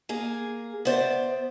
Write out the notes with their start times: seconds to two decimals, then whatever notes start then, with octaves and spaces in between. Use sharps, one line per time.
0.09 A#3 G#4
0.85 B3 C5 D5 E5